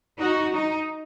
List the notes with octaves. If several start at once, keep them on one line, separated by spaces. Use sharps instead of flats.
D#4 F#4
D#4